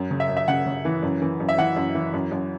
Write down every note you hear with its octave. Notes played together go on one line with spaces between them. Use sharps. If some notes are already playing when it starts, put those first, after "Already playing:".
Already playing: F#2
C#3
E5
F#2
E5
C#3 F#5
C#3
E3
F#2
E3
F#2
E5
E3 F#5
F#2
E3
F#2
F#2